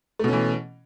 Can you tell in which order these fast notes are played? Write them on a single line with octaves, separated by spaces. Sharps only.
A3 B2 C#4 E3